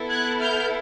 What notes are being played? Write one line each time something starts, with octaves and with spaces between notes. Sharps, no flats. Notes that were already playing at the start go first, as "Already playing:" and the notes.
Already playing: B3 E4 A4
F#6 G#6
F6 G6